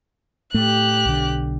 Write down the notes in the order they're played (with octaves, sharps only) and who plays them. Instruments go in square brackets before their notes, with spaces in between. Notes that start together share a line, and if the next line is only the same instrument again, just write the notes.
[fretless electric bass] A2 A3 [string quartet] G4 F#6
[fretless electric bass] B1 D3